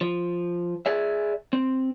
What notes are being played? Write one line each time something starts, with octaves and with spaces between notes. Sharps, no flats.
F3
G#4 D5 E5
C4